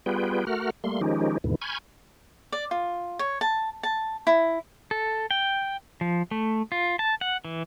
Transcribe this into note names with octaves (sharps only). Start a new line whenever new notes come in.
G3 B3 F4 G#4 B4 G5
A3 F#4 A#4 F#5 F6
G3 A3 A#3 C6
D#3 F3 G#3 C#4 D#4 G4
D#2 G#2 B2 D3 E3
G#5 B5 C#6 F6 G6 G#6
D5
F4
C#5
A5
A5
E4
A4
G5
F3
A3
F4
A5
F#5
E3